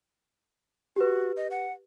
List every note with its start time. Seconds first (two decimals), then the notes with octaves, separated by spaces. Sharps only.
0.96 F#4 G4 B4
1.37 D#5
1.51 F#5